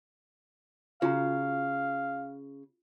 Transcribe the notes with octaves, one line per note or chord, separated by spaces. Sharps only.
C#3 F4 F#4 F5 A#5